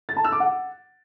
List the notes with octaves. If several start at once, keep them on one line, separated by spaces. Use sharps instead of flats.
A6
A5
E6
D6
F#5